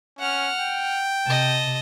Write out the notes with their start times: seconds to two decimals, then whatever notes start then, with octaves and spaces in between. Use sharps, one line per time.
0.19 C#4 F#5 F6
0.59 G5
1.26 C3 D#5 A5